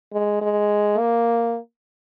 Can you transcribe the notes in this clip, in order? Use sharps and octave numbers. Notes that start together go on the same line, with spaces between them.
G#3
G#3
A#3